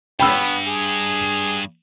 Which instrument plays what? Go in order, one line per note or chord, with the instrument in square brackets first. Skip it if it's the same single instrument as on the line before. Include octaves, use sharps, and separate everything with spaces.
[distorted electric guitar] G2 [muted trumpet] B3 [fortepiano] G5 B5 E6
[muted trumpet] G#4